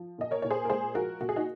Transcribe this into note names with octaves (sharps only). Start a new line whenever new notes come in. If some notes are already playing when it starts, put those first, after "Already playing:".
Already playing: F3
A#2 D#5
A#4 C#5
A#2 C#5
G#4 C5
A#4
G#3 G#4 C5
F3 F#4 A#4
A#2 F#4
G#4
D#4 F#4